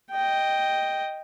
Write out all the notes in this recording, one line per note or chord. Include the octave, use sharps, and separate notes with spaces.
D#5 G5